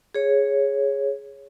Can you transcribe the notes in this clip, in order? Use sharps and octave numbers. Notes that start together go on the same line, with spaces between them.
G#4 C#5